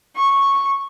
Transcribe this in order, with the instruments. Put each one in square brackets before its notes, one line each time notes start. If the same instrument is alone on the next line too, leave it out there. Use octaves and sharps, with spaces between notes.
[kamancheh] C#6